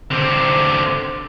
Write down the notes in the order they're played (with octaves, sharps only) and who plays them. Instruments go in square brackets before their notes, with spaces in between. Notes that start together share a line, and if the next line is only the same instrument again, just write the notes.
[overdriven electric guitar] D3 C4